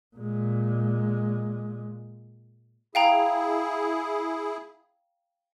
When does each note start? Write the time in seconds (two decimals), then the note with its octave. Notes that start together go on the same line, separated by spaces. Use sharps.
0.17 A#2 G#3
2.95 E4 G#4 F5 G5 A#5